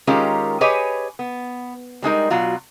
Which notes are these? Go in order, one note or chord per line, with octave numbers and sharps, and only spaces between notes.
D#3 G#3 C#4 F4 G4 A#4
G4 G#4 B4 C#5 D#5 G#5
B3
G3 G#3 D#4 A#4
B2 F#3 F4 F#4